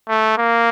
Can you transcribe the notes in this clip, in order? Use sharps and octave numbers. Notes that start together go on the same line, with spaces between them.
A3
A#3